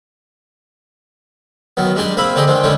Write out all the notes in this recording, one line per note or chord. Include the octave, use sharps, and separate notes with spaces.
D#3 F#3 B3
G3 G#3 D4 G4 G#5
A#3 C4 G#4 E5 B5
D3 C4 G4 G#4 D#5
D3 D#3 G#3 C4
D3 G3 G#3 C#4 D#4